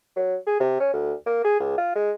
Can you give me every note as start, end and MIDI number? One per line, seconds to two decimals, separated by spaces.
0.16 0.36 54
0.47 0.57 68
0.60 0.76 48
0.80 0.89 61
0.93 1.13 38
1.26 1.43 58
1.45 1.57 68
1.60 1.73 37
1.78 1.92 65
1.96 2.11 56